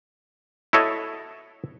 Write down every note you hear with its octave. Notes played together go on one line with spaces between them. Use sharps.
E4 F#4 A4 C#5 D#5